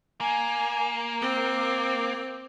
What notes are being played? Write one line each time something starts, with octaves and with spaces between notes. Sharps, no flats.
A#3 G#5
C4 D6